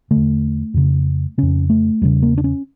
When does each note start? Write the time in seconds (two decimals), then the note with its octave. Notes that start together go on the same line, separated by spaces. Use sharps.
0.11 D3 A3
0.16 E2
0.74 F2 C#3
1.38 F2 C#3 C#4
1.70 A3
2.02 E2 C#3 G3
2.22 A#3
2.38 D4
2.44 C#4